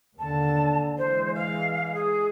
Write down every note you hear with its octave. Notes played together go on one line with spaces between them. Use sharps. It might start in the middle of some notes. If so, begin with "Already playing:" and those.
D#2 D3 A5
E3 G#3 C5
F5
G#4